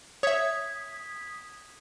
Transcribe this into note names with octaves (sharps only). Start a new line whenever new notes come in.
C#5 E5 D#6 G#6 B6